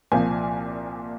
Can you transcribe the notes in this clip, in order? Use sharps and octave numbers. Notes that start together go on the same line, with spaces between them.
C2 A#2 F3 A#3 G#5